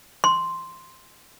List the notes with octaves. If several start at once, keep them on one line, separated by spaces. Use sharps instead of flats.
C6